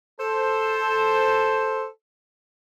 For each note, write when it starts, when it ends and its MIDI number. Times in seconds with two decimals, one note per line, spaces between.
0.19 1.87 69
0.19 1.87 72